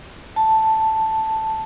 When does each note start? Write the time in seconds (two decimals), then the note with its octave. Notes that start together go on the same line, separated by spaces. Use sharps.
0.36 A5